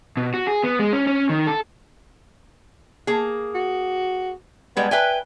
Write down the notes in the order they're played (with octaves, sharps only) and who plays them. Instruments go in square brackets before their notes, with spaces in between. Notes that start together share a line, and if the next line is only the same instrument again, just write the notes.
[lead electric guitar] B2
F#4
G#4
B3
G#3
C#4
C#4
D#3
A4
[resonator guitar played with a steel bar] A#3 G#4
[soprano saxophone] F#4
[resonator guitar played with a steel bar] G3 G#3 [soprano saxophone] B3
[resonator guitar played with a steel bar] B4 E5 G#5 [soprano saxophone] G5